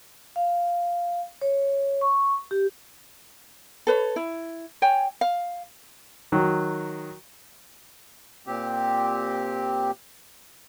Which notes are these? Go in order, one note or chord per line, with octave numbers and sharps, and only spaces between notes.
F5
C#5
C#6
G4
A4 B4 C#5
E4
C#5 G5 G#5
F5
D#3 F#3
A#2 C4 G4